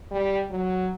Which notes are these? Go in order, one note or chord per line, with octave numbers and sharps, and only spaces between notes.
G3
F#3